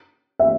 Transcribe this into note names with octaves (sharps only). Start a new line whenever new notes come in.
E5